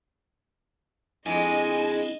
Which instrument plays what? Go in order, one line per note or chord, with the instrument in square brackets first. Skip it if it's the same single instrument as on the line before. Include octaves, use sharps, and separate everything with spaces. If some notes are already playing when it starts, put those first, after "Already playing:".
[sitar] F2 G#3 [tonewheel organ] C4 D4 E4 [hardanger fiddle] D#5 [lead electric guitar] G#5